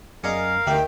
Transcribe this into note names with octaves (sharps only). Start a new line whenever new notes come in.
F#2 G#4 A#4 D5 D#5 F5 C#7
D2 D3 D#3 G4 E5 G5